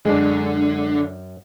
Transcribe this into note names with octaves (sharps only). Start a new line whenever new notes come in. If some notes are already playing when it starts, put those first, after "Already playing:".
F#2 D3 G#3 D4